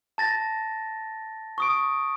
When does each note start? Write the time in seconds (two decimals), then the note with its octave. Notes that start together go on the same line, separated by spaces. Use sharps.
0.18 A5 A6 A#6
1.58 C#6 D#6 D7